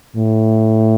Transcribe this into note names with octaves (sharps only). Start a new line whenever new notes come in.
A2